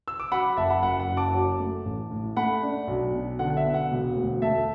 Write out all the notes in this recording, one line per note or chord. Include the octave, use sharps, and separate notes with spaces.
E6
D6
F#3 F#5 B5
F#5
F#1 E5 A5
F#5 B5
F#1 F#5
F#5
F#2
A5 D6
F#3
A3
A1
A2
A3 F#5 B5
D4
B1
B2
D3 F#5
F#5
E5
B3
F#5
E1
D2
A3 E5 A5